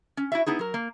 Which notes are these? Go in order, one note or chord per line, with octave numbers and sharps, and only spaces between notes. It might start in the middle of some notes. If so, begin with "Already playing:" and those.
C#4
E4 F#4 E5
B3 D#4 E4 G#4
F#3 A#4
A#3